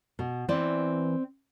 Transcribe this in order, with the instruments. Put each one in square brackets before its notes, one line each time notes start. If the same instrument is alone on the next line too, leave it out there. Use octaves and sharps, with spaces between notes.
[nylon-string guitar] B2
[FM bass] E3 [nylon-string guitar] C4 D5